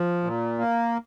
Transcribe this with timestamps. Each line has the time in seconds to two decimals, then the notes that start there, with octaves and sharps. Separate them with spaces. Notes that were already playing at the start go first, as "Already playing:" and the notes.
Already playing: F3
0.24 A#2
0.59 A#3